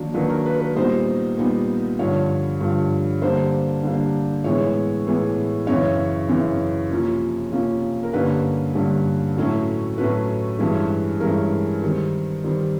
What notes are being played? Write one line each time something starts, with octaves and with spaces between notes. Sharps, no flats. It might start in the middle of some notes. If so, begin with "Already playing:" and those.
Already playing: D#3 F#3 A#3 D4
D#3 F#3 A#3 D4 B4
A#4
B4
B4
A#2 G3 B3 D#4 C5
A#2 G3 B3 D#4
G2 D3 F3 C#5
G2 D3 F3
D3 G3 A#3 D4 C5
D3 G3 A#3 D4
A2 E3 G#3 B3 C#5
A2 E3 G#3 B3
F#2 C#3 E3 C#5
F#2 C#3 E3
F2 C3 F3 A#3 C#4
F2 C3 F3 A#3 C#4
A#4
G2 D3 G3 A#3 C#4 B4
G2 D3 G3 A#3 C#4
A2 F#3 A3 C#4 E4
A2 F#3 A3 C#4 E4 B4
G2 E3 G#3 C#4
G2 E3 G#3 C#4 A#4
D#3 G3 C4
D#3 G3 C4